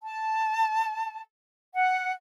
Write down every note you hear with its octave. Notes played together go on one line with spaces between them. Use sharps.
A5
F#5